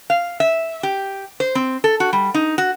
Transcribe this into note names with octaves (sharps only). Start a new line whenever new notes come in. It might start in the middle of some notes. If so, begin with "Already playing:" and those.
F5
E5
G4
C5
C4
A4
F#4
G3
D#4
F#4